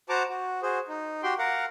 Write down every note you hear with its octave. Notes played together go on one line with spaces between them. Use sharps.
F#4 C5 F#5 A5 A#5 D6
F#4
F#4 G#4 C5
D#4
F#4 G4 G5 C6
A#4 F5 F#5